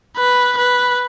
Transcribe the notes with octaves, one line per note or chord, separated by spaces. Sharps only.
B4
B4